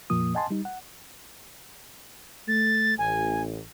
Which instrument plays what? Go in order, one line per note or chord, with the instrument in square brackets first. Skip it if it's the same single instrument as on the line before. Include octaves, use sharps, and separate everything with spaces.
[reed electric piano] F2 A#2 F3 A#3 D#6
D#5 F#5 G#5 A5 C6
G3 D#4
F#5
[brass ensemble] A3 [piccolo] A6
[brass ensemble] A1 [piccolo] G#5